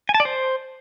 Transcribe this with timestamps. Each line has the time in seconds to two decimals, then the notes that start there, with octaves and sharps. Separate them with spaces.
0.09 G#5
0.14 A5
0.20 D5
0.25 C5